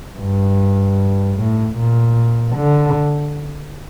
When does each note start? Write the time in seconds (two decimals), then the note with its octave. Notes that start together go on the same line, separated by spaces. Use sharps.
0.17 G2
1.36 A2
1.76 A#2
2.56 D3